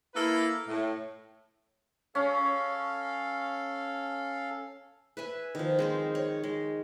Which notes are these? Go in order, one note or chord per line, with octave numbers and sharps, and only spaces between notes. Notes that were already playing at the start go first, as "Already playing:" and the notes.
A#3 E4 A4 B4
A2
C#4 A4 F5
B4 E5 G#5
D#3 F3
G#3 C4 C5
C#5
G#3